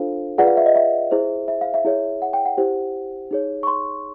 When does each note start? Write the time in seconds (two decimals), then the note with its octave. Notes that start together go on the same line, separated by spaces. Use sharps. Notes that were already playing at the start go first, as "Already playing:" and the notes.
Already playing: D4 F4 A4 C5 F5
0.38 F4 G#4 B4 D5 F#5
0.47 F5
0.57 E5
0.66 D#5
0.75 E5
1.11 E4 G#4 C5
1.48 E5
1.61 F5
1.74 E5
1.85 E4 G#4 C#5
2.22 F#5
2.33 G5
2.45 F#5
2.58 E4 G4 C5
3.31 D#4 G#4 C#5
3.63 C#6
3.67 C6